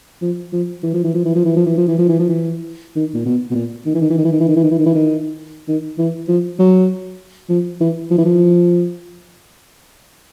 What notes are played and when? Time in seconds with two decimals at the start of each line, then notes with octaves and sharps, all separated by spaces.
0.22 F3
0.53 F3
0.83 E3
0.94 F3
1.04 E3
1.14 F3
1.25 E3
1.35 F3
1.45 E3
1.56 F3
1.66 E3
1.78 F3
1.88 E3
1.98 F3
2.09 E3
2.19 F3
2.29 E3
2.96 D#3
3.14 A#2
3.26 B2
3.50 B2
3.55 A#2
3.86 D#3
3.94 E3
4.01 D#3
4.10 E3
4.18 D#3
4.25 E3
4.32 D#3
4.40 E3
4.48 D#3
4.56 E3
4.63 D#3
4.71 E3
4.79 D#3
4.86 E3
4.95 D#3
5.68 D#3
5.98 E3
6.28 F3
6.59 F#3
7.49 F3
7.80 E3
8.11 F3
8.18 E3
8.25 F3